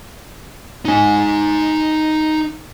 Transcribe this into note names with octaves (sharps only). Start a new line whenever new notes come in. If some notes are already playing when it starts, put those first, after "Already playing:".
D#4 G#5